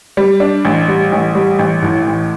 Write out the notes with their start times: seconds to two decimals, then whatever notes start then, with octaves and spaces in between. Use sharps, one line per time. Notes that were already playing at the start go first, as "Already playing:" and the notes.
0.17 G3
0.40 D4
0.65 A1
0.88 G3
1.12 A1
1.35 G3
1.59 A1
1.82 A2
2.07 A1